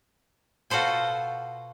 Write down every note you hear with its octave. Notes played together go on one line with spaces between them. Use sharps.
B2 F4 F#4 A4 C5 G#5